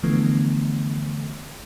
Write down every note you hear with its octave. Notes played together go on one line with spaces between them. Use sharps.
D3 E3 F3 A3 B3